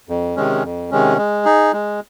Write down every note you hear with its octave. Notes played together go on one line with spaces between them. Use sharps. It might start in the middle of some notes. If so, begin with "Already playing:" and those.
F2
C3 D#3 G#3 C#4
F2
C3 D#3 G#3 C#4
G#3
D#4 G#4
G#3